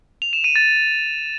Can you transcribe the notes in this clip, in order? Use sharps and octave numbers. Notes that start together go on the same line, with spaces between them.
F7
E7
D#7
A6